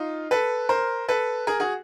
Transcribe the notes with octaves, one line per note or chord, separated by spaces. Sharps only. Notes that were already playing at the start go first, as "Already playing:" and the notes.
Already playing: D#4 F4
A4 B4
A#4 C5
A4 B4
G#4 A#4
F#4 G#4